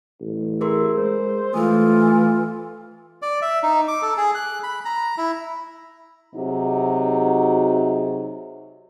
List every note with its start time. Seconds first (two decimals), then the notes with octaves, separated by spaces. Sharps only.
0.21 A1
0.61 E4 G#4 A#4 C6
0.97 G#3 C5
1.54 E3 A3 F4 D#6
3.22 D5
3.42 E5
3.63 D#4
3.88 D6
4.02 A4
4.17 G#4
4.35 F#6
4.63 B5
4.85 A#5
5.17 E4
6.36 C3 F#3 D#4 F#4 G#4